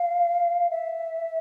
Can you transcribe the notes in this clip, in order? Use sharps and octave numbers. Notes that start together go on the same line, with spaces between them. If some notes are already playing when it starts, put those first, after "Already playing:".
Already playing: F5
E5